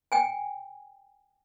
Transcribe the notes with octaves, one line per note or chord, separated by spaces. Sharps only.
G5 G#5